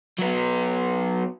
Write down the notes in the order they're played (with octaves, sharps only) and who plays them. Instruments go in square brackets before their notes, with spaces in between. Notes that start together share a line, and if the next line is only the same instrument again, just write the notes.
[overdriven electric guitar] F#3 B3